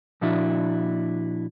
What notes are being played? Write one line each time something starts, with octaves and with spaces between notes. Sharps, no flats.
A#2 F3 D4 E4 F#4